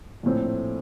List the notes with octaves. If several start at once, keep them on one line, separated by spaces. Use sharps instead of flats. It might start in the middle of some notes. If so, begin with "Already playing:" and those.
A#1 A2 A3 C4